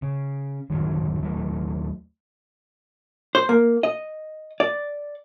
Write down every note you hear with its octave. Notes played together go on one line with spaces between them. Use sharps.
C#3
D1 F#2 D#3 F#3
D#2 F#3 A3
C5
A#3
D#5
D5